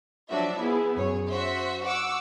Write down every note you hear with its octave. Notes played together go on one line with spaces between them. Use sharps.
F3 F#3 D4 F#4 E5
B3 E4 G#4
F#2 G#4 C#5
F#4 C5 E5
F#5 C#6 D6 E6